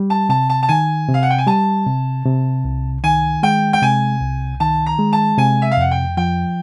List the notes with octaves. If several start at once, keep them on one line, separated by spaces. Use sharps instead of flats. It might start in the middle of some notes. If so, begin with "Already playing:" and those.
Already playing: G3
A5
C3 A5
A5
A5
D#3 G#5
C3
F5
F#5
G5
G#5
G3 A5
C3
C3
C2
D#3 G#5
G#3 G5
G5
C3 G#5
C2
D#3 A5
A#5
G#3
A5
C3 G#5
E5
F5
F2 F#5
G5
F3 G5